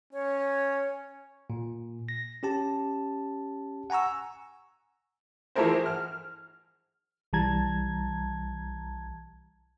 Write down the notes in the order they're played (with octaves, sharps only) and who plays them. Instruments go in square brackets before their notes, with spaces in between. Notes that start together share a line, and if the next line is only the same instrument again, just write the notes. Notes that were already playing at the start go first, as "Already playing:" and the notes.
[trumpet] C#4 [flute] C#5
[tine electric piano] A#2
A#6
C#4 G4 A5
F#5 G#5 A#5 C#6 E6
[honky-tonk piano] E3 F3 A3 G#4 A#4 C5
F6
[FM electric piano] B1 E3 G3 A5 A#5 G#6